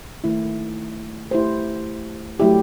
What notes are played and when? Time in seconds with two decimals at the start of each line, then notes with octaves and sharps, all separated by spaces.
0.24 D#3 A3 E4
1.31 A3 E4 G4 C5
2.40 F#3 A3 E4 G4